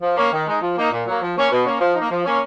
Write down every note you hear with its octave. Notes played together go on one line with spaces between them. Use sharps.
F3
A#3 C#4
D#3
G#3 D#4
F3
A#3 D#4
A#2
F#3 A#3
F3
A#3 C#4
B2
A#3 C#4
F3
A#3 D#4
F3
A#3 C#4